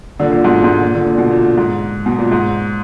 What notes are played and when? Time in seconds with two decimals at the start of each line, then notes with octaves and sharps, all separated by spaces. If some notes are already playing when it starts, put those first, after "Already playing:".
0.20 A#2 D3
0.31 A#2 D3
0.44 G#2 B2
0.63 G#2 B2
0.82 A#2
0.94 A#2 D3
1.07 A#2
1.18 B2
1.31 A#2
1.58 G#2
2.06 B2
2.18 A#2
2.32 G#2